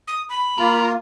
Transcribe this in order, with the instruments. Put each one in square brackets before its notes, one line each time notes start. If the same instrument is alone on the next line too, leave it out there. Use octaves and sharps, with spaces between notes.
[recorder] D#6
B5
[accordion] A#3 F4 [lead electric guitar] A#4